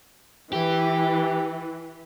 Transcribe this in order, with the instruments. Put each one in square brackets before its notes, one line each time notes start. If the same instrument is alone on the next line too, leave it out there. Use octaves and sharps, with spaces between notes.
[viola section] E3 [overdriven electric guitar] G4